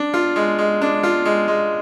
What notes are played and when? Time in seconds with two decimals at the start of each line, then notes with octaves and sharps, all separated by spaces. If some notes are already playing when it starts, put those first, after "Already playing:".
Already playing: D4
0.14 F4
0.36 G#3
0.58 G#3
0.81 D4
1.03 F4
1.25 G#3
1.48 G#3